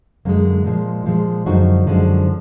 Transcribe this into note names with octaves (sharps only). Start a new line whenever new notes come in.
F#2 D3 G#3 A#3
A#2 F3 G#3
A#2 F3 G#3
F#2 D3 F3 G#3 D#4 F#4
F#2 D3 F3 G#3